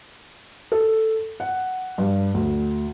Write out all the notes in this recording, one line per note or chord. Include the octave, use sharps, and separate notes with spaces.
A4
F#5
G2
D2